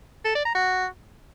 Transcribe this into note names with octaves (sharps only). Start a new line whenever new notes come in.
A4
D5
A#5
F#4